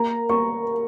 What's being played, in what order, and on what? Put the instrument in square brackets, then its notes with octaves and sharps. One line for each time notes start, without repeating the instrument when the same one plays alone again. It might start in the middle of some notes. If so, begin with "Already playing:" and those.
Already playing: [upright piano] A#3 A#5
A#3 C#6